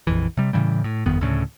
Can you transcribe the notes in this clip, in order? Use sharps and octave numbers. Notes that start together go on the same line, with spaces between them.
A#1 F2 E3
C3 G3
A2 C#3 E3 G3
A2
G1 F2 D#3 B3
D2 A2 C#3